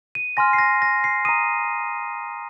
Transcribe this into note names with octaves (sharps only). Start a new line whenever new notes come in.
D#7
G#5 C6 F6 A#6
C7
A#6
A#6
C7
A#5 D#6 D#7